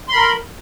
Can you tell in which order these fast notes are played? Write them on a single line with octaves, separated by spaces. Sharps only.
C6 B5 A#4